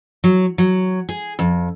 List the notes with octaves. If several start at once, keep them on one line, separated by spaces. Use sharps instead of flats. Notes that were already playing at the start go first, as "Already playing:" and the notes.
F#3
F#3
G#4
F2